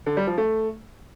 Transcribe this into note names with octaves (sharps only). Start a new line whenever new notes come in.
D3
G3
F3
A3